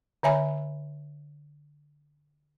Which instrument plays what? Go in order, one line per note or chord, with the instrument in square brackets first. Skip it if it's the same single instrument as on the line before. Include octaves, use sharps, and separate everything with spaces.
[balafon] D3 C#5 E5 G#5 B5